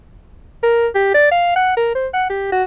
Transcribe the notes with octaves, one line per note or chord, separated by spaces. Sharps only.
A#4
G4
D5
F5
F#5
A#4
C5
F#5
G4
F#4